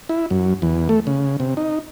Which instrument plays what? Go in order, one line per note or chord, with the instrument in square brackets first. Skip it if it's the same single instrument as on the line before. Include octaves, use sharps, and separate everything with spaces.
[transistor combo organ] E4
F#2
E2
A3
C#3
C3
D#4